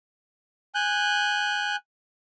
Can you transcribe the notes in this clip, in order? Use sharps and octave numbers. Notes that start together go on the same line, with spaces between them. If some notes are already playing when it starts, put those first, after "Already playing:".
G#5 F#6 G6